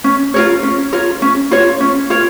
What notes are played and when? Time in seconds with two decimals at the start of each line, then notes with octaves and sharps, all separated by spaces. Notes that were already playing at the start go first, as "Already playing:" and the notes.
0.04 C#4
0.34 F4 A#4 C#5
0.63 C#4
0.93 F4 A#4 C#5
1.22 C#4
1.51 F4 A#4 C#5
1.80 C#4
2.10 F4 A#4 C#5